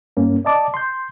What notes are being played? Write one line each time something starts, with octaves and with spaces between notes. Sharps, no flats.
G2 A#3 C#4
D5 D#5 A5 D6
C6 G6